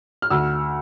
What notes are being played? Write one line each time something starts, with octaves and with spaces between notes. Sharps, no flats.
F6
D2 E6